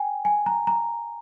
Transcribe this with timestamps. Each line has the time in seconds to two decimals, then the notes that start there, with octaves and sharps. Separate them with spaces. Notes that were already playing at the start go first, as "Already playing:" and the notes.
Already playing: G5 G#5
0.25 G#5
0.46 A#5
0.67 A#5